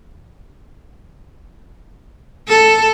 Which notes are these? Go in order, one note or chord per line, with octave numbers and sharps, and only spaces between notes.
A4